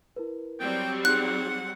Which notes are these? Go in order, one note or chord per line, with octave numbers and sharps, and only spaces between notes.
E4 A#4 B4
F#3 G3 C4 G5
D#4 G#4 F#5 F#6